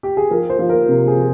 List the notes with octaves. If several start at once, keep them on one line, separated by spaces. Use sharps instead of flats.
G4
G#4
F3 A#4
C5
F3
A#4
C3
G#4
F3